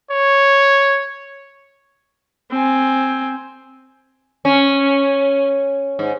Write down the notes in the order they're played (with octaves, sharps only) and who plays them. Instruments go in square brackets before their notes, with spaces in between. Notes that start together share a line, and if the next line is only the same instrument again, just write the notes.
[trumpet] C#5
[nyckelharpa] C4 G#5
[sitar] C#4
G#2